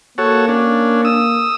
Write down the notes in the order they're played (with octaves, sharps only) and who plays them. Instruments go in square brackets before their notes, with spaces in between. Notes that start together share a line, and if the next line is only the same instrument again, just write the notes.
[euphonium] A#3 [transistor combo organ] F#4 A4 C#5
[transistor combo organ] C#4 D4
D#6 E6